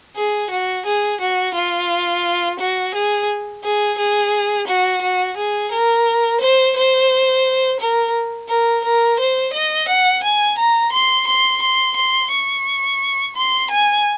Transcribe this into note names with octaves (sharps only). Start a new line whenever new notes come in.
G#4
F#4
G#4
F#4
F4
F#4
G#4
G#4
G#4
F#4
F#4
G#4
A#4
C5
C5
A#4
A#4
A#4
C5
D#5
F#5
G#5
A#5
C6
C6
C6
C6
C#6
C6
G#5